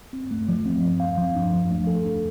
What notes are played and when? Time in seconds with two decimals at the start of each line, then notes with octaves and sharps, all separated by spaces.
0.13 C4
0.31 A3
0.49 F3
0.66 C4
0.83 C4
1.00 F5
1.17 F3
1.35 D4
1.53 F3
1.70 A3
1.87 A4
2.05 D4